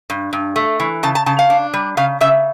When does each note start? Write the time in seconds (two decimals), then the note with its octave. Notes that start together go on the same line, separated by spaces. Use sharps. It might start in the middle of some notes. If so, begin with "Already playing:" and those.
0.10 G2
0.33 G2
0.56 A3
0.80 E3
1.03 C#3 A5
1.15 A5
1.26 C#3 A5
1.39 F5
1.50 D4
1.74 G3
1.97 C#3 F5
2.21 C#3 E5